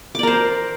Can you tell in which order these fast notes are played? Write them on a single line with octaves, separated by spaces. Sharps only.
D6 D5 A#4 C5